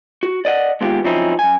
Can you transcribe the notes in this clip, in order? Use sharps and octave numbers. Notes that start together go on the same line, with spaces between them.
F#4
D5 D#5 F#5
D#2 G#3 B3 F4 G4
F3 F#3 C4 C#4 D#4 E4
F#2 G#5